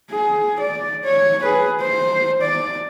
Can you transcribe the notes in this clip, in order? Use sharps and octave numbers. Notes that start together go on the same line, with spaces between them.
G#4
D5
C#5
G#4 B4
C5
D5